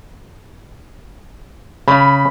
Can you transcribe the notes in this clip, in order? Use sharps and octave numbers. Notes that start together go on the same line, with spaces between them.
C#3 B5